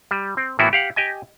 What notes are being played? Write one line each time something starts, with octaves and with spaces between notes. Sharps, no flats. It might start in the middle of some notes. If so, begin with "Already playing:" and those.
G3
C4
A2 E3 A#3 B3 E4 F#4
G4 F5 F#5
G4 D#5 G#5